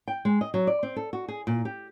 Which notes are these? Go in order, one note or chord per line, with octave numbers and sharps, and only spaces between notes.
G5
G#3
D#5
F#3
D5
C4
A4
F#4
G#4
A#2
G4